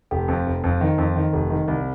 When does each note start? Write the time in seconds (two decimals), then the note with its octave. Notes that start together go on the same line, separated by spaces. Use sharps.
0.11 F1 G4
0.28 F2
0.46 F1
0.64 F2
0.81 D#3
0.98 F2
1.16 D#3
1.33 F1
1.50 D#3
1.68 C2